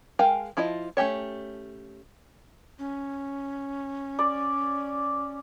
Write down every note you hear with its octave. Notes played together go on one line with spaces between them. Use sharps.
G#3 A#4 F5 G5 G#5
F3 E4 F4 D#5
A3 C#4 G4 C#5
C#4
D5